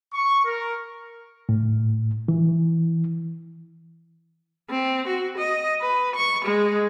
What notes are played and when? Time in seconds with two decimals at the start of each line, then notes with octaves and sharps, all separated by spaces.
0.14 C#6
0.45 A#4
1.49 A2
2.28 E3
4.70 C4
5.08 F#4
5.38 D#5
5.81 B4
6.16 C#6
6.45 G#3